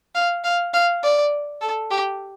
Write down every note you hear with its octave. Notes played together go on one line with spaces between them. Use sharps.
F5
F5
F5
D5
A4
G4